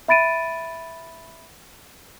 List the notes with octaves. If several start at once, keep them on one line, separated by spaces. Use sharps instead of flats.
E5 B5 A6 D7 D#7